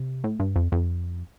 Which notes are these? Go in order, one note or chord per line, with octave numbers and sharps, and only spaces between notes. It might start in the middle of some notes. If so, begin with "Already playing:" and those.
Already playing: C3
A2
G2
F2
F2